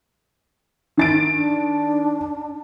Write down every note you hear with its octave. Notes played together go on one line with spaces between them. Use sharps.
D#3 A6 D7
D4